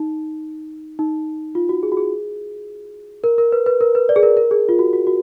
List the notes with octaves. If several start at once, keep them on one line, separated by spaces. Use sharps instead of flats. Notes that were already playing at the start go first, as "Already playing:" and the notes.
Already playing: D#4
D#4
F4
F#4
G#4
F#4
G#4
A#4
A#4
B4
B4
A#4
B4
D5
G#4
A#4
A#4
G#4
F4
F#4
F#4
F#4